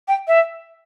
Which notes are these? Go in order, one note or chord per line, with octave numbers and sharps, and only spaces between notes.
G5
E5